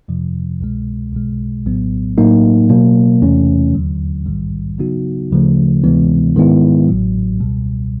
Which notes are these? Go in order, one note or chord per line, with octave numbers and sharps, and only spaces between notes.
F2 C3 F3
C2 B2 G#3
B1 B2 G#3
A#1 A2 F#3 B3
A2 F#3 A#3 D#4
B2 F#3 A#3
E2 C3 E3 A3 C#4
D#2 D3 F#3
A#1 G#2 D#3 G3
C#3 F#3 B3 D#4 F#4
D2 C#3 F3 A3
D2 C3 E3 G#3 B3
G#2 D#3 G#3 B3 E4
A1 A2 F#3
C#2 B2 G3